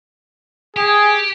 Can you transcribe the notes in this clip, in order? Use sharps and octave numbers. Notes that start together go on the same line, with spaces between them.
G4 G#4